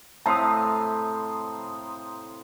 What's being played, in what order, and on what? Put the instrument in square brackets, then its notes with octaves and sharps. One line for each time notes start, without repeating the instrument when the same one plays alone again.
[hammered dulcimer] A2 C3 F5 [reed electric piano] A5 [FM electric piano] A#5 C6 D#6